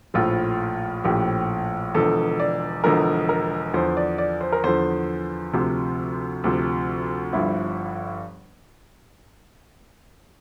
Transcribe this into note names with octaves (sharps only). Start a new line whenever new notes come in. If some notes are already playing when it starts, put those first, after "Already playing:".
A#1 A2 F3 F4
A#1 A2 F3 G4
E1 E2 D3 F3 A4
D5
E1 E2 D3 F3 A#4
A#4
E2 D3 F3 C5
D5
D5
C5
A#4
E2 D3 F3 C5
D2 C3 F3
D2 C3 F3
G1 G2 F3 E4